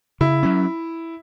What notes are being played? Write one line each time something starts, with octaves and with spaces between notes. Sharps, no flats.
C#3 E4
F#3 C#4